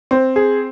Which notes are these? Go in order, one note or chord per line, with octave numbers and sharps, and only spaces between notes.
C4
G#4